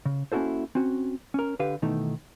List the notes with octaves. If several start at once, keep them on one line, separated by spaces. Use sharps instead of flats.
C#3
A#3 C#4 E4 F#4 A4 C5
C4 C#4 F#4
C#4 A#4
D3 G4 B4 F5
B2 D#3 E3 A3 D#4